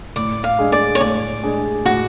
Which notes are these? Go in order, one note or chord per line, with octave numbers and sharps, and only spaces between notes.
A2 D5
F5
G#3 D4 G#4
D5
C#5
A2 D5
G#3 D4 G#4
A2 F#4